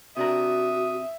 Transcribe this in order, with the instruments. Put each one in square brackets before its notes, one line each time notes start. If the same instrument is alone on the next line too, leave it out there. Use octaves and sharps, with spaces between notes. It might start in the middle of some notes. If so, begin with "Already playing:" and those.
[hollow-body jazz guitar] C3 D4 A#4 [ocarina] F#4 [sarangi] E5 [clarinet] D#6